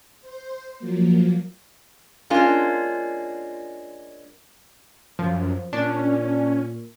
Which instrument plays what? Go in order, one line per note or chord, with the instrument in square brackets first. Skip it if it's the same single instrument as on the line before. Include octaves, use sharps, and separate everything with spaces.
[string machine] C5
F3 F#3 A#3
[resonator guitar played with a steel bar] G#3 A#3 C#4 D4 F4 G#5
[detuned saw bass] F#2 [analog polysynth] F3
[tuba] A#2 [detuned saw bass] C#4 [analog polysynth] D4